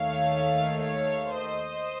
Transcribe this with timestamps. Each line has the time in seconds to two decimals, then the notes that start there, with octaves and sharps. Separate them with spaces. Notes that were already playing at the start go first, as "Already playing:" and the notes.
Already playing: D#2 D#3 A3 C#5 F5
0.81 C#5 F5
1.35 C5 D#5